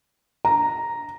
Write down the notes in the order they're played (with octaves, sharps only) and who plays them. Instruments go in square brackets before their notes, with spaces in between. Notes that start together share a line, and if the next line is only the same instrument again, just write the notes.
[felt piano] A#5